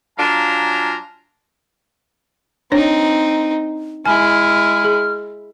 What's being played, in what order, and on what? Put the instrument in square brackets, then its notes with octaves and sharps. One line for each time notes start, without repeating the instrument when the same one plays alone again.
[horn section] F#3 D4 F4 F5 G#5 A#5
[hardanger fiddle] C4 D#4 [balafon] D4 C#5
[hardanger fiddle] G#3 E4 [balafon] G#5 [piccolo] F6
[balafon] G#4